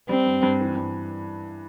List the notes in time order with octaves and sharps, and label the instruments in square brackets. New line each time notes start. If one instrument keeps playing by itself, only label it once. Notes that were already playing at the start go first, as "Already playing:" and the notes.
[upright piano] G3 [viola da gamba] C4
[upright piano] G2
G2
E3
G2